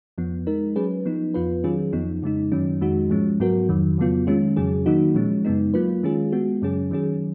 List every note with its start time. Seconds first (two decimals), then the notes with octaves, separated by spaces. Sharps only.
0.18 F2 F3 B3
0.47 G#3 D#4 A#4
0.76 F#3 C#4 G#4 B4
1.05 F3 B3 D#4
1.34 F2 F3 B3 F4 B4
1.64 D#3 F#3 C#4 F4 G#4
1.93 F2 F3 B3 D#4
2.23 F2 C#3 G#3 D#4
2.52 F#2 D#3 F#3 C#4
2.81 F2 D#3 G#3 D#4 F#4
3.10 G#2 F3 G#3 C#4
3.40 G#2 F#3 B3 F#4 A#4
3.69 F2 D#3 F#3
3.98 F2 C#3 F#3 B3 F4
4.27 D#3 G#3 C#4 F4
4.56 F2 C#3 F#3 C#4 G#4
4.86 D#3 F#3 A#3 D#4 F#4
5.15 A#2 F3 G#3 C#4
5.45 F#2 C#3 G#3 B3 D#4
5.74 F#3 A#3 F4 B4
6.03 D#3 G#3 C#4 F4 G#4
6.32 G#3 B3 F#4
6.62 F#2 C#3 F#3 C#4 G#4
6.91 D#3 F#3 C#4 G#4